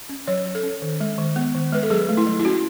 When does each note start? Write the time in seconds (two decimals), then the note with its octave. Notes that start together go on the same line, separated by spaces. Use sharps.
0.09 C#4
0.27 F#3 C#5
0.45 F#3
0.55 A4
0.63 C#4
0.82 D#3
1.00 G#3
1.18 D#3
1.36 B3
1.55 D#3
1.72 G#3 B4
1.83 A4
1.90 F#3 G#4
2.09 A3
2.17 E4
2.27 F#3
2.40 E4
2.45 C#4 F#4